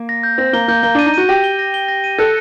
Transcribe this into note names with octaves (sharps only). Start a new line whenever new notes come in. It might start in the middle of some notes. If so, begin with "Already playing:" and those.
Already playing: A#3
A#6
G6
C4 A#6
A#3 G7
A#3 G6
A#3 G7
D4 D#7
D#4
F#4 D#7
G4 A#6
G7
A#6
G7
A#6
D#7
A4 F#6